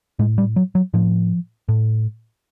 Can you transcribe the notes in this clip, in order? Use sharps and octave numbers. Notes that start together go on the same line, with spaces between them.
A2 G#3
G3
F#3
F#3
A2 F3
A2